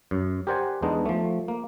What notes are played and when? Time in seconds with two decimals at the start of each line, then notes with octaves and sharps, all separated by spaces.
0.11 F#2
0.47 G4 A#4 C5 D5 F#5 G#5
0.82 E2 G#3 B3 D4 D#4
1.06 F3 A3
1.48 A#3